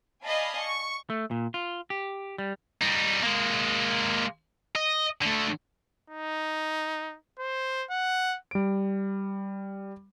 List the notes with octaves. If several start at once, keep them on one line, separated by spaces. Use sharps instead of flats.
D5 D#5 F5 G#5 A5 B5
C#6
A3
A#2
F4
G4
G3
G3 D#4
G#3 A#3
D#5
D3 A3
D#4
C5
F#5
G3 D7